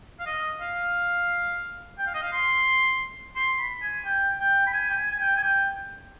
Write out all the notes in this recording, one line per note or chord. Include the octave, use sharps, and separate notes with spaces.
F5
D#5
F5
G5
F5
D#5
F5
C6
C6
B5
G#5
G5
G5
B5
G#5
G5
G#5
G#5
G5
G#5
G5